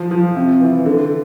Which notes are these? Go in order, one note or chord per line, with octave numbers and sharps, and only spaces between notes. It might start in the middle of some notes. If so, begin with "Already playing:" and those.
Already playing: F3
F3
C3
E3
D3